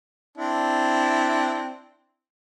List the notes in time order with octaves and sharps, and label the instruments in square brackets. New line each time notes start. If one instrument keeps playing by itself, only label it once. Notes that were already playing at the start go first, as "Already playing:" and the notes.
[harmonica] C4 D4 E4